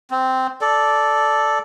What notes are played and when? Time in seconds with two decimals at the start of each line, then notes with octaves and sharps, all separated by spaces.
0.11 C4
0.61 A4 D5